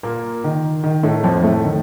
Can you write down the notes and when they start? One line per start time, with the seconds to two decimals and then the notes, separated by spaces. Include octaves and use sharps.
0.03 A#2 A#3
0.44 D#3
0.84 D#3
1.03 A2 A3
1.23 F2 F3
1.43 A2 A3
1.64 D#3